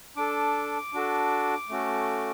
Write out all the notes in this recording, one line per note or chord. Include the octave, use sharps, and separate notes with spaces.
D4 A4 D6
D4 F#4 A4
A3 C#4 F#4 A4